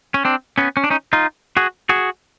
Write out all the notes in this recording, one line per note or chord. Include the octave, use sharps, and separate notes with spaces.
C#4
C4 D4
B3 C#4
C#4
D4
C#4 D#4
D#4 F4
F#4 G#4
F#4 G#4